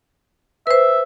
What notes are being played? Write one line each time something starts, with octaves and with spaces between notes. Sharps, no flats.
B4 C5 E5